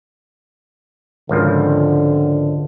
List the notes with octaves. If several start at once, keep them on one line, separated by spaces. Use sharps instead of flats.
G#1 C#2 D3 F3